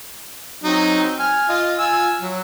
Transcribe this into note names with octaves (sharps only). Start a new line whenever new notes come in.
F#3 C4 D#4
C4
G#5 F6
F4 D#5
F4 G#5 E6
F#3